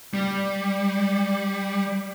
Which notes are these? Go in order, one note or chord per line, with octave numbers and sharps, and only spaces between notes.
G3